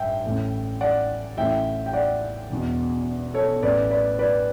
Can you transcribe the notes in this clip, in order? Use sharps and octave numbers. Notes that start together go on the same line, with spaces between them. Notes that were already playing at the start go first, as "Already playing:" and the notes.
Already playing: A1 G2 E5 G5
A1 A2 E3
D5 F#5
A1 A2 E3 E5 G5
G5
D5 F#5
E1 E2 B2
A4 C#5
A1 A2 E3 B4 D5
B4 D5
B4 D5